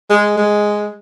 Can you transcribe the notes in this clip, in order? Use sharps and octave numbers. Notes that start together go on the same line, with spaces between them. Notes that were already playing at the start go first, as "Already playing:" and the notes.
G#3
G#3